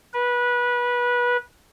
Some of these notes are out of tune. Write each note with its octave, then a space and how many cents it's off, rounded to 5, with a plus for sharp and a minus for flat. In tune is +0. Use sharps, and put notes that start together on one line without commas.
B4 -20